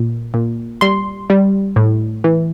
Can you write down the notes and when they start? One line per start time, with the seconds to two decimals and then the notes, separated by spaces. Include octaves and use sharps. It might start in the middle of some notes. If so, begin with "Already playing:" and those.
Already playing: A#2
0.34 A#2
0.81 G3 C6
1.30 G3
1.76 A2
2.24 E3